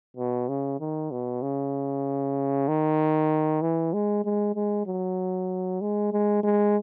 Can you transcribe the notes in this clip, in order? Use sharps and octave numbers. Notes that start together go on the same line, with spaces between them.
B2
C#3
D#3
B2
C#3
D#3
E3
G#3
G#3
G#3
F#3
G#3
G#3
G#3